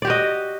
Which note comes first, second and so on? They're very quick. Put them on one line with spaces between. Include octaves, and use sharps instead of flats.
D5 G4 F#4 D#5